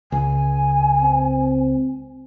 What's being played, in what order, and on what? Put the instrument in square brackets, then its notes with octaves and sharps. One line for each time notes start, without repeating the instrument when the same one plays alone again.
[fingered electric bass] C#2 [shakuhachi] G#5
[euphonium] C4